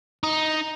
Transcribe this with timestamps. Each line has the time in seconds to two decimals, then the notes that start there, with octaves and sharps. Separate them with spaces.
0.23 D#4